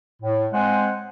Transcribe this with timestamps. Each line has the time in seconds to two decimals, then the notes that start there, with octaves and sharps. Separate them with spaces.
0.22 A2
0.53 G#3 C4 C5 F#5 G#5